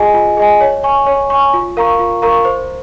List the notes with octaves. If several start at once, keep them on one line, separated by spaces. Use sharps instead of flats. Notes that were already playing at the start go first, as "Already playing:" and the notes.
Already playing: F4 G#4 D#5 G#5
F4
G#4 D#5 G#5
C#5
G#5 C#6
C#5
G#5 C#6
F4
A#4 F5 A#5 C#6
F4
A#4 F5 A#5 C#6
C5